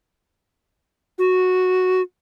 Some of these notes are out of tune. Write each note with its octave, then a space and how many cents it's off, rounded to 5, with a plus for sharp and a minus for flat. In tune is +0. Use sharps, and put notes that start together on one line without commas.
F#4 -5